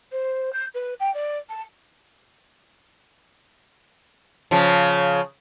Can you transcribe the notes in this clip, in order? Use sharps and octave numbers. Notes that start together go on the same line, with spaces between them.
C5
G6
B4
G5
D5
A5
C#3 F3